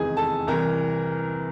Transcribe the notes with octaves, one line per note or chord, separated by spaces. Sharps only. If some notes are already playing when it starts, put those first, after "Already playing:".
Already playing: F1 E2 C3 D#3 G#3 E4 G#4 G#5
A4 A5
C2 C3 E3 A#4 A#5